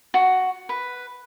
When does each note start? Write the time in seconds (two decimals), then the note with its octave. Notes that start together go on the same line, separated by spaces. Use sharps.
0.14 F#4
0.69 B4